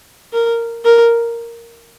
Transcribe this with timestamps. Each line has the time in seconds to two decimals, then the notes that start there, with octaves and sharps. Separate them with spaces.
0.33 A#4
0.85 A#4